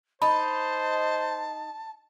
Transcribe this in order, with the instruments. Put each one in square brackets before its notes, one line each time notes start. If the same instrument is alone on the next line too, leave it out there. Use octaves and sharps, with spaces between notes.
[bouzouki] D#4 [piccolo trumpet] C5 [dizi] A5 [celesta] B5